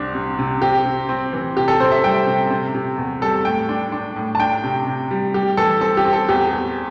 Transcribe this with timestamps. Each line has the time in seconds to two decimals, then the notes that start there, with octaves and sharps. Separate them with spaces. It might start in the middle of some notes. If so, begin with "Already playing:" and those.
Already playing: C2 C4 D4
0.15 C3
0.39 C3
0.62 C4 G4
0.86 C3
1.09 C4
1.33 E3
1.56 C3 G4
1.68 A4
1.80 C3 C5
1.92 E5
2.04 G3 G5
2.27 C3
2.50 C3
2.75 C3
2.98 E2
3.22 G3 A4
3.45 A2 G5
3.69 D4
3.92 D4
4.16 A2
4.35 A5
4.40 D4 G5
4.64 C3
4.87 C3
5.11 G3
5.34 G3 G4
5.57 E3 A4
5.81 C4 A4
5.97 G4
6.05 C4
6.13 A4
6.29 E2 G4
6.53 E2